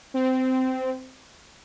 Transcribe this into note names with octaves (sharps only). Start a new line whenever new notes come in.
C4